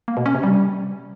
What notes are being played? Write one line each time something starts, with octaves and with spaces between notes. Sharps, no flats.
A#3
B2
C#4
C3
G3